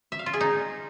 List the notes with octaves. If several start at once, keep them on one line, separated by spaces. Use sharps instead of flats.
E5
F5
F4
G#4
D#4